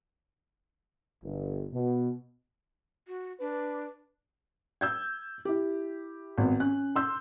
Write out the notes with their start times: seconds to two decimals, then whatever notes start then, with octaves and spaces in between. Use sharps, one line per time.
1.23 G1
1.73 B2
3.08 F#4
3.40 D4 B4
4.81 E6 G6 G#6
5.45 E4 G4
6.38 G#1 B3
6.60 C#4 F#6
6.96 C6 E6 G6